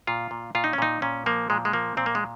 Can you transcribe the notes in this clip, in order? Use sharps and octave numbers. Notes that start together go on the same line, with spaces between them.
A#2 F4
A#2
A#2 F4
D#4
C#4
A#2 D#4
A#2 C#4
F3 A#3
A#2 G#3
G#3
F3 A#3
A#2 C4
A#3
G#3